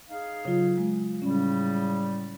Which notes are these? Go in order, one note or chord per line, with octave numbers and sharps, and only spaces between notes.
D#4 G#4 F5
C#3 F#3 F4
G#3
A2 C#3 G3 C#4